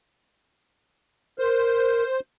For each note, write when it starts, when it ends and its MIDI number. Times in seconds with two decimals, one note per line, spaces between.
1.39 2.04 70
1.39 2.20 72